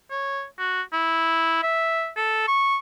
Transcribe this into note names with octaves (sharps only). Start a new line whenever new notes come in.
C#5
F#4
E4
E5
A4
C#6